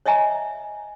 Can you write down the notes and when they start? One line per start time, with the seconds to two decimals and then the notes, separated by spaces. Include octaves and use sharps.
0.06 C#5 D#5 E5 G#5 A#5